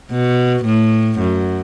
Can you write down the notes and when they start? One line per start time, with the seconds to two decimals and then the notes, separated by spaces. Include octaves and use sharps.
0.11 B2
0.66 A2
1.20 F#2